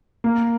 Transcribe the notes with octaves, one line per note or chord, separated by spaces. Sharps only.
A#3